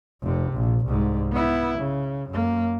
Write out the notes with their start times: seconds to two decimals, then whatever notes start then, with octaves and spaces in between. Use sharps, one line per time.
0.23 F1 C3
0.53 A#1
0.87 C2 G#2
1.32 B3 E4
1.79 C#3
2.30 F#2 A#3